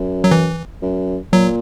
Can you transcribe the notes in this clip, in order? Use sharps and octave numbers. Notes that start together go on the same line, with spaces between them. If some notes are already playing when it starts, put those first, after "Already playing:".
Already playing: F#2
F#3
E3
F#2
A#2 F#3